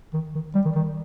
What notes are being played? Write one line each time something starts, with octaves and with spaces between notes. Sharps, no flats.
D#3
D#3
G3
D#3
D#3